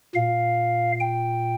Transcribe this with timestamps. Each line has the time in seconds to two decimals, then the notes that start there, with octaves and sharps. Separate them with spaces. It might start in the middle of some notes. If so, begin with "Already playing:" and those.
0.15 A#2 F5
1.00 G5